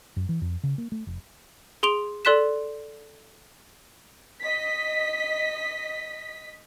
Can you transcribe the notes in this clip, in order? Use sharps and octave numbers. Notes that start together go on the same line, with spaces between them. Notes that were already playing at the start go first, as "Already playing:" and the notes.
F#2
E3
F2
C#3
A#3
A3
F1
G#4 C6 D7 F7
A4 D5 C6 F#6 B6 E7
D#5 B6